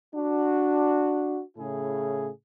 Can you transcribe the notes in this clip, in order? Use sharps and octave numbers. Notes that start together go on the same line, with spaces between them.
D4 F#4
A2 C#3 E4 G#4